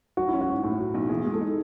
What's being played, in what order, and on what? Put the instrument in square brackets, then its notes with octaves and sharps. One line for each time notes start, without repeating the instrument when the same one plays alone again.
[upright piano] F#3 [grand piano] F#4
[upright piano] C#4 [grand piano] E4
[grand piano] F#4
[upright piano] G#2
A2
F#3
B1
[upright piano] E3 [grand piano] G#4
[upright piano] G#3
[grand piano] A4
[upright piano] D#4